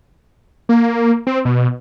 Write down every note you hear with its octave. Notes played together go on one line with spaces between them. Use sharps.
A#3
C4
B2